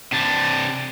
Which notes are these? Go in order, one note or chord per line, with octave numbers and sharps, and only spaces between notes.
C3 D4